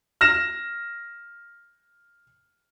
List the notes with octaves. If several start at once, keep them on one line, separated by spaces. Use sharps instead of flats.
F6 A#6 E7